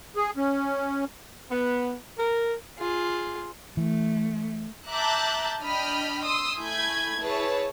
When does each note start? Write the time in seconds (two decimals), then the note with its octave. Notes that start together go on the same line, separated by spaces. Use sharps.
0.16 G#4
0.37 C#4
1.50 B3
2.18 A#4
2.78 F4 G#4
3.77 E3 A3
4.91 E5 A5 A#5 D6 F#6 G6
5.62 D4 D#5 G5 B5 F6
6.24 C6 D#6 E6
6.59 A3 E4 G#5 B5 G6 G#6
7.20 E4 G#4 B4 C#5 A5